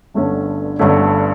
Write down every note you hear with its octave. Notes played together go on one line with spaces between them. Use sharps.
G1 G2 D3 A3 C#4
G1 G2 D3 A3 C#4